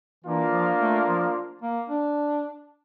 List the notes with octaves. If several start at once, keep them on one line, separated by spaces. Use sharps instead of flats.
E3 A#3 D4 F4
F3
A3
F3
A#3
D4